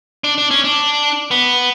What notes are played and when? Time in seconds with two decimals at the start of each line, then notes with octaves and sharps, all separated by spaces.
0.24 D4
0.38 D4
0.51 C#4
0.64 D4
1.31 B3